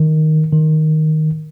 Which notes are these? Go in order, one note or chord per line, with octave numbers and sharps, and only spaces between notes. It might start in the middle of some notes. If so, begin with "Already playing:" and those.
Already playing: D#3
D#3